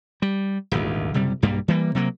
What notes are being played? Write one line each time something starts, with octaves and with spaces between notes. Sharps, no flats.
G3
D#1 G#1 D2
F#1 C3 G3
B1 G2 G3 A#3
E3 G3 A#3
C3 F#3 A#3